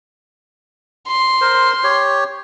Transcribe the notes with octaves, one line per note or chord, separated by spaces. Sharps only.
C6
A#4 C5
G4 C#5